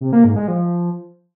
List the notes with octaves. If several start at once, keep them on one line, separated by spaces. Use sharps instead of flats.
C3
A#3
G#2
G#3
F3